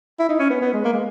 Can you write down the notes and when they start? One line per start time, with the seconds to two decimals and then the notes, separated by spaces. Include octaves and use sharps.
0.19 E4
0.29 D#4
0.39 C#4
0.50 B3
0.61 B3
0.73 G#3
0.85 A#3
0.93 G#3